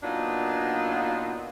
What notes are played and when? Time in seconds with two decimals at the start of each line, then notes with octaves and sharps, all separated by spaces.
0.03 A#2 F#3 B3 D4 D#4 F4